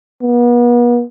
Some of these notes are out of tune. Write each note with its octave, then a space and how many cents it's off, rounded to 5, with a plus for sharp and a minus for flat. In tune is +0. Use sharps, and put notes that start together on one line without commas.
B3 -40